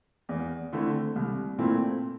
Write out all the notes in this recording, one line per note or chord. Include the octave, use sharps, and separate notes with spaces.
E2
D3 A3 C4 E4
C2
A#2 A3 C4 E4